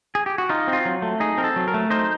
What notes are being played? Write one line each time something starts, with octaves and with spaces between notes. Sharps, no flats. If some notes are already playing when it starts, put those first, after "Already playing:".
G#4
G4
F#4
D#4 F4
C4
F4
F#3
A3
D#4 G#4
C4 A#4
A4
F#3
A#4
A3
D#4 C5